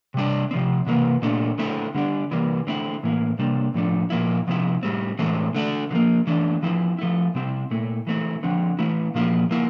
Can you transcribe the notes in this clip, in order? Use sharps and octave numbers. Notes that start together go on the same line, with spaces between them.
C3 G3 D4
C3 F3 C4
C3 E3 A#3
A#2 A3 D4
D3 A3 C4 E4
D3 G3 D4
C3 E3 G3 A#3
D3 A3 C4 E4
A2 E3 A#3 E4
C3 G3 A#3 D4
A2 F3 A3 D4
A#2 F3 A#3 E4
C3 F3 C4 E4
A2 G3 C4
A2 E3 A3 C4
D3 A3 D4
D3 F3 A#3
E3 A3 D4
F3 C4 E4
F3 A3 E4
C3 G3 C4 E4
A#2 A3 E4
E3 A3 C4 E4
D3 F3 C4
E3 A3 E4
A#2 F3 A#3 E4
F3 A#3 E4